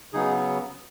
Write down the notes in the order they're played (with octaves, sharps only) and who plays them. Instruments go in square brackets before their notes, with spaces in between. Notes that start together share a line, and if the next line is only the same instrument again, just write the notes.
[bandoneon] C#3 F#3 B3 D#4 G#4